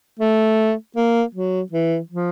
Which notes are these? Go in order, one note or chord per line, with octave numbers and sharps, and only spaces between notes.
A3
A#3
F#3
E3
F3